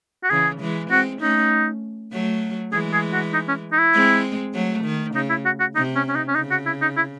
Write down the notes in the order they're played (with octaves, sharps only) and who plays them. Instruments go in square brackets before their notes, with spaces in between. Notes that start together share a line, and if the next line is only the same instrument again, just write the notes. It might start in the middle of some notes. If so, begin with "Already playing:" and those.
[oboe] F#4
[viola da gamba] C#3 E3 [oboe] G#4
[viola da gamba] E3 G#3
[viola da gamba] G#3 C4 [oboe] F#4
[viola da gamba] A3 C#4 [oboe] D#4
[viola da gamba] F#3 A3
[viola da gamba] E3 G#3 [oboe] G#4
[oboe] G#4
F#4
D#4
C#4
D#4
E4
[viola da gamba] G#3 C4
F#3 A3
D#3
[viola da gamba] C#3 [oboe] D#4
[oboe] E4
F#4
F#4
[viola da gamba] C3 [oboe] D#4
[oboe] C#4
C#4
D#4
C#4
[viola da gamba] C#3 [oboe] D#4
[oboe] F#4
E4
D#4
E4